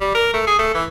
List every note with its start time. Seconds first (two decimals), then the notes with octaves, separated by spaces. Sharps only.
0.01 G3
0.15 A#4
0.34 A3
0.47 G#4
0.59 A3
0.74 E3